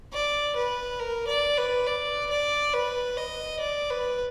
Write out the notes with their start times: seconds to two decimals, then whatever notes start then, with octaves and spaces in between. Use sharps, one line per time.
0.12 D5
0.56 B4
0.99 A#4
1.27 D5
1.57 B4
1.87 D5
2.30 D5
2.73 B4
3.17 D#5
3.60 D5
3.90 B4